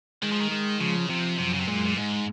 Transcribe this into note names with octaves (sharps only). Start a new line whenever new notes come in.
D#3 G#3
F3
D#3
G#3
C#3 F3
C3 F3
F#2 C3
C#3
C3
A#2 G#3
A#2
G#2 G#3